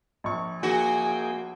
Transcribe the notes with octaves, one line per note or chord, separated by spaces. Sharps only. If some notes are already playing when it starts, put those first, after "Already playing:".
A#1 C#6
A#3 F#4 G#4 G5 G#5